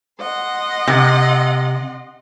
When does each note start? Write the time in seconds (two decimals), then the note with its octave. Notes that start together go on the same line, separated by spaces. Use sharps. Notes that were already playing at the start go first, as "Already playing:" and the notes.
0.19 D#5 F#5 C6
0.87 C3